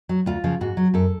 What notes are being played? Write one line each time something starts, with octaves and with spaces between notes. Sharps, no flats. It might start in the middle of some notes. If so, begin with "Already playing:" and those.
F#3
D2 F4
C#3 F3
G#2 F#4
F#3
F#2 A4